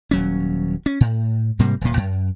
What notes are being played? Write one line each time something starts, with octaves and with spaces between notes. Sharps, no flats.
D#1 F#3 C#4
C#4
A2
G#2 C3 G3 A#3
D#1 A#2
F#2